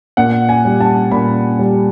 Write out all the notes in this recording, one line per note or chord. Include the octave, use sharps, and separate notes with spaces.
A#2 F#5
G#5
G3
A5
A#2 B5
G3